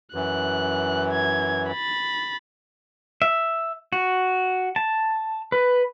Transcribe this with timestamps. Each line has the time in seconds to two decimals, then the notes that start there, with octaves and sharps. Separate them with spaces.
0.14 F#2 E3 F#6
1.12 G#6
1.70 B5 A6
3.22 E5
3.93 F#4
4.76 A5
5.52 B4